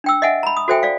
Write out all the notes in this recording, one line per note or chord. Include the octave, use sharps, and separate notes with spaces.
D4 G5 E6
D#5 E5 F#5 G#5
A#5 B5
D#6
F#4 A4 C5 E5 G5 G#5
D5 F5